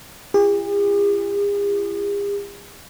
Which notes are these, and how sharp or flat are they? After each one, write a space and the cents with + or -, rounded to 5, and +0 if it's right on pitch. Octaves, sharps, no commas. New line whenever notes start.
F4 -45 G#4 -45